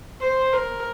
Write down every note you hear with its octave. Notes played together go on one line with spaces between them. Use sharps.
C5
A#4